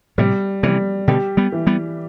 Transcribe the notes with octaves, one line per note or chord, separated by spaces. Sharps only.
A2 C3 G3
C3 E3 G3
B2 D3 G4
G3 B3
E3
G3 B3